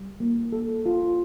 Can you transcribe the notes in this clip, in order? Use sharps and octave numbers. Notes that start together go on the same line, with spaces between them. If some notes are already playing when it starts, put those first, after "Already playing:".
Already playing: G3
A#3
A4
F4